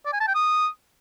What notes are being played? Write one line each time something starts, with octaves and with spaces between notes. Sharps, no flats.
D5
G#5
A5
G5
D#6